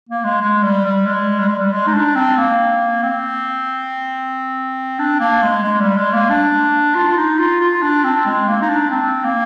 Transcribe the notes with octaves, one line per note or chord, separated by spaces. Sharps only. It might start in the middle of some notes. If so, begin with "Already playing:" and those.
A#3
G#3
G#3
G3
G3
G#3
G3
G#3
G3
G#3
D#4
D4
C4
A#3
C4
D4
A#3
G#3
G#3
G3
G#3
A#3
D4
F4
F4
D#4
F4
F4
D4
C4
G#3
A#3
D#4
D4
C4
A#3